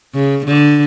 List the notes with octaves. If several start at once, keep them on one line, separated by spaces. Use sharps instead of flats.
C#3
D3